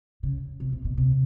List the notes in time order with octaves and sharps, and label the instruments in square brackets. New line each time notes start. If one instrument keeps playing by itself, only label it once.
[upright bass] C#3
C3
C3
B2
C3